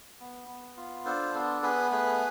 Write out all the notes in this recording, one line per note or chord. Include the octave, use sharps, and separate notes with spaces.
B3
B3
F4
D4 A4 C5
B3 A4
B3 G#4 B4
A3 G#4 B4